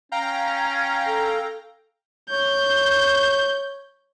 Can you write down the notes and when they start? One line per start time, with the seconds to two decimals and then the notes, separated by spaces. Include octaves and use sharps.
0.12 C#4 F5 G5 A#5
1.07 A4
2.30 C#5 G6